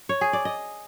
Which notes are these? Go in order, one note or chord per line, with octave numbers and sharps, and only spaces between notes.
C#5
G#4
D5
D#5